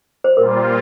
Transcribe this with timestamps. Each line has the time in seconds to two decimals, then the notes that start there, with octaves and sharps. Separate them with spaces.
0.24 C5
0.36 A#2 G3 A#3 F4 A#4